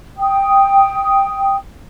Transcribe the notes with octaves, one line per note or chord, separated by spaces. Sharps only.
G5 D#6